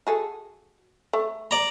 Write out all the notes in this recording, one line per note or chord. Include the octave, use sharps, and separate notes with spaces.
F#4 G#4 A4
A3
D5 A#5